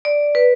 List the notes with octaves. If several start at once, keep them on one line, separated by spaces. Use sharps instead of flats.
D5
B4